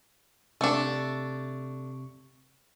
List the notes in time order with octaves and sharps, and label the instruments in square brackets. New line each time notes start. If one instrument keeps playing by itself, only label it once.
[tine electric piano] C3 C#6 C#7 [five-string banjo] A3 D4